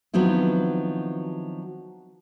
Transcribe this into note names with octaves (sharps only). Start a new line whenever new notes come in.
D#3 F3 F#3 B3 C4 E4